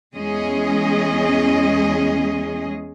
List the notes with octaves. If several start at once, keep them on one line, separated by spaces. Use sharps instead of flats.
E2 G#3 C#4 G#4 D#5